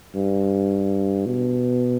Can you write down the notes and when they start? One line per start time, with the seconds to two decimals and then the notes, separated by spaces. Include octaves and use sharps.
0.15 G2
1.26 B2